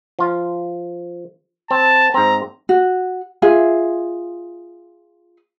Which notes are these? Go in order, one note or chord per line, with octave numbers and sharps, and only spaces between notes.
F3 F4
C4 A5
G#2 C4 A#5
F#4
F4 G#4 E5